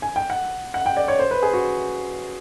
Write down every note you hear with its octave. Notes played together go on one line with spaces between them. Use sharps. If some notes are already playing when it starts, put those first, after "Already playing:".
G#5
G5
F#5
F#5
G5
D5
C#5
C5
B4
G#4
F#4